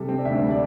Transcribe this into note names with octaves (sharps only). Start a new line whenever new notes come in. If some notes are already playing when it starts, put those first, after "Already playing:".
Already playing: C3 G3 A4
C4
D5
D2 E5
G3
D5